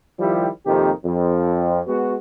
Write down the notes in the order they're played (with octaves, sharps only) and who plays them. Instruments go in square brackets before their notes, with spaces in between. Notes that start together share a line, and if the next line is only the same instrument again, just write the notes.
[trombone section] D#3 F3 G3 E4 G4
F2 C3 D#3 A#3 G4
F2
G#3 B3 F#4